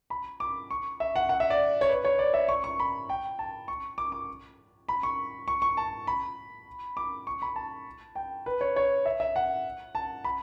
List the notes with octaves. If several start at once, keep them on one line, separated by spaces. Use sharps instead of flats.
B5
D6
C#6
E5
F#5
F#5
E5
D5
C#5
B4
C#5
D5
E5
C#6
C#6
B5
G5
A5
C#6
D6
D6
B5
C#6
C#6
C#6
A5
B5
D6
C#6
B5
A5
G5
B4
C#5
C#5
E5
E5
F#5
A5
B5